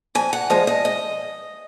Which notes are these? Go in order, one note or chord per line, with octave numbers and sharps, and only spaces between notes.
F2 G#5
F#5
F3 G#3 D#5
D#5
D#5